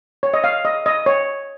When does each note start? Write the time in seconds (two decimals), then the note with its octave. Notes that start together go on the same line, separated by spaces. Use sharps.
0.23 C#5
0.34 D#5
0.44 F5
0.65 D#5
0.86 D#5
1.06 C#5